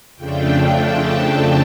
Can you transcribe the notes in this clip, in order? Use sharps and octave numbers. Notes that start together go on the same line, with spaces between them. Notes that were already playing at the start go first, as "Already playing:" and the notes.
F2 C#3 F3 A3 D4 G5
A5